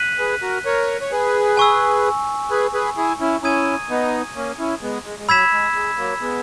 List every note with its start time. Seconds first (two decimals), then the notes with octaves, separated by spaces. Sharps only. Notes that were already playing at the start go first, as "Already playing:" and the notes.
Already playing: F#6 B6 D#7 F#7
0.19 G#4 B4
0.42 F#4 A#4
0.65 A#4 C#5
1.01 C#5
1.11 G#4 B4
1.57 G#5 C#6 E6
2.50 G#4 B4
2.74 G#4 B4
2.97 E4 G#4
3.20 C#4 E4
3.43 C#4 E4 A#5 D#6 G#6 D#7
3.90 B3 D#4
4.36 A#3 C#4
4.59 C#4 E4
4.82 G#3 B3
5.06 G#3
5.19 G#3
5.28 F#3 B5 E6 G#6 B6 E7
5.52 G#3
5.75 G#3
5.98 F#3 A#3
6.21 G#3 B3